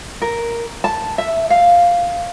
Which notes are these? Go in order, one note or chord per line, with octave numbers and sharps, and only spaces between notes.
A#4
A5
E5
F5